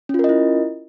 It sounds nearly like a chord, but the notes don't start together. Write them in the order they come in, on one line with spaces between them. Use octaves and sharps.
C#4 F4 A#4 D#5 E4